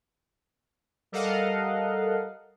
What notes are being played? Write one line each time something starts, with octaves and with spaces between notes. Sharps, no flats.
G3 A4 A#4 D#5 F5 F#5